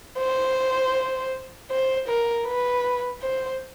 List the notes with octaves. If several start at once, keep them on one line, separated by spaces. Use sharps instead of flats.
C5
C5
A#4
B4
C5